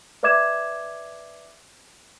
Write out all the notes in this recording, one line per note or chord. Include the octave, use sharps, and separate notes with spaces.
B4 D5 E5 D6 G#6 E7